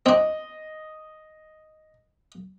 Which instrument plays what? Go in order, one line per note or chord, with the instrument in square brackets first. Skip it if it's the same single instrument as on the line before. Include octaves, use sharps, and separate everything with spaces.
[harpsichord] C4 D4 [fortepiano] D#5